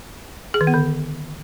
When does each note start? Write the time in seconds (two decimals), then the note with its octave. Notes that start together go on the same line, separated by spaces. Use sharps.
0.54 G#4
0.61 D#3
0.67 B3
0.74 D3